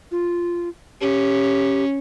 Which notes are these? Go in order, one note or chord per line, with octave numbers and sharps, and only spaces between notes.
F4
C#4 G4